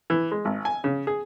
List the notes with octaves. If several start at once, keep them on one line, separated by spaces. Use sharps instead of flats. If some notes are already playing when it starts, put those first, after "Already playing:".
E3
G#3
G#1
G#5
C#3
G#4